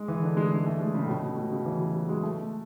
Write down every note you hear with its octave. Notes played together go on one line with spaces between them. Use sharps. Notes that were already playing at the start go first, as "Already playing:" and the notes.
Already playing: G#3
E3
D3
G#3
G#3
A3
G#3
C#3
A2
B2
A2
B2
C#3
E3
F#3
F#3
G#3
A3